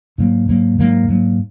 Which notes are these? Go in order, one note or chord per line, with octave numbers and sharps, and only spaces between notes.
G#2 F#3 A#3
G#2 F#3 A#3
G#2 F#3 A#3
G#2 F#3 A#3